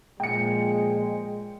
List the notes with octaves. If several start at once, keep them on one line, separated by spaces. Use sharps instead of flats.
A#2 F3 G#3 G5 C#7